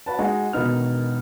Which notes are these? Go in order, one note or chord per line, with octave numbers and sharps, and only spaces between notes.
F#4 B4 A5
G#3 D#4 F#4
E1 B2 D#3 B3 D#4 F6